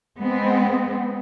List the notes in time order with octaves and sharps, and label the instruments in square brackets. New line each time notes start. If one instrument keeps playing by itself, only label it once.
[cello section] G#3 B3 C4